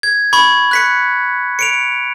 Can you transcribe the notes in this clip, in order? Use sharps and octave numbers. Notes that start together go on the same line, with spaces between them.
G#6
B5 C#6 G#6
F#6 B6 C#7
C#7 D7 F7